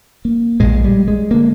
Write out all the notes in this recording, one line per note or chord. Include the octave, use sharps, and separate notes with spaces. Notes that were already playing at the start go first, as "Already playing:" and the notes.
A#3
A#1 A#2 G#3
G3
G#3
D3 A#3